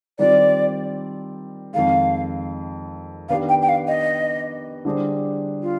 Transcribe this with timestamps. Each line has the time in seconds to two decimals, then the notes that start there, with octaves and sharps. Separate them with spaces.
0.19 D#3 G3 C4 F4 C5 D5
1.74 F2 D#3 G#3 F5
3.29 D#3 B3 D4 G4 B4 F5
3.49 G5
3.62 G5
3.69 F5
3.88 D#5
4.85 D3 G3 D4 G#4 C5
5.63 F4